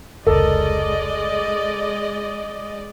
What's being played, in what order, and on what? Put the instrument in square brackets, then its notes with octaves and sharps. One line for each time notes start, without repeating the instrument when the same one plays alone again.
[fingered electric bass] F1 C#2 [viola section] G#3 D5 D#5 [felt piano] A4 A#4